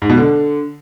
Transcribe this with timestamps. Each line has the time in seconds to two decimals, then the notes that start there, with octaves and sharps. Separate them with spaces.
0.02 G#2
0.10 B2
0.17 D3